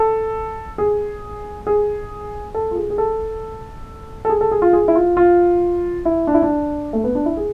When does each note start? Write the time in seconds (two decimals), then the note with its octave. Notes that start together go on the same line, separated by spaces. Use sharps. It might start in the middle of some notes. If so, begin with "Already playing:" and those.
Already playing: A4
0.78 G#4
1.67 G#4
2.54 A4
2.71 F4
2.76 G#4
2.90 G#4
2.98 A4
4.25 A4
4.30 G#4
4.41 A4
4.51 G#4
4.62 F4
4.73 G#4
4.88 E4
4.95 F4
5.17 F4
6.05 E4
6.27 D4
6.34 E4
6.42 D4
6.93 A3
7.04 B3
7.15 D4
7.26 E4
7.37 G#4